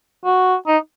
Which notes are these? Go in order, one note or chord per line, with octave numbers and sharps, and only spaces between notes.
F#4
D#4